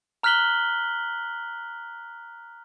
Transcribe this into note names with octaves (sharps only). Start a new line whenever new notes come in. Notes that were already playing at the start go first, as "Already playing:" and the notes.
A#5 F6 F#6 B6 F#7 G7